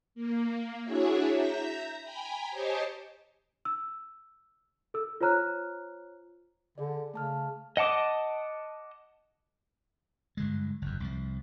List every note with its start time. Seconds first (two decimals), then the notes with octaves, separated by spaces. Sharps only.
0.15 A#3
0.83 D4 E4 F#4 G#4 C#5 E5
1.31 E5 A#5 G6 A#6
2.01 G5 G#5 A#5 B5
2.50 G4 C5 C#5 D#5 G#5 A5
3.65 E6
4.94 A4 E6
5.21 F4 C5 C#5 A#5 F6 F#6
6.78 D3 G#4 D5
7.14 C#3 A3 A5 F6
7.77 D#5 F#5 A5 D6 D#6
10.37 G2 D3 G#3
10.82 F#1 F2
11.00 C2 F3